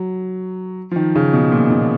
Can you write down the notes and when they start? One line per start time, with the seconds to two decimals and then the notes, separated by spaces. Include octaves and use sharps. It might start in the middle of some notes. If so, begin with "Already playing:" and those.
Already playing: F#3
0.91 F3
0.96 D#3
1.15 C#3
1.33 B2
1.52 A#2
1.70 B2